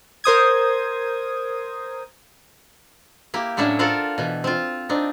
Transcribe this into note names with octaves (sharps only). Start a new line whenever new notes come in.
A#4 C5 D#6 G#6
A#3 E4 G4
A2 F#3 C#4 D4 E4 E5
F4 A4 A#4 C5 F5 F#5
B2 E3
C4 F4
C4 D4 D#4